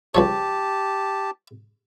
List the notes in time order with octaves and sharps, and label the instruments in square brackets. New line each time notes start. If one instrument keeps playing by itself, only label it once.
[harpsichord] C#2 F3 C#5 [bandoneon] G4 A5